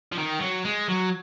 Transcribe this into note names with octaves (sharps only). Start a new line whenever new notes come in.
F3
D#3
F#3
G#3
F#3